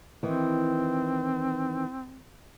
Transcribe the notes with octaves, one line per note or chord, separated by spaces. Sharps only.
D#3 E3 C4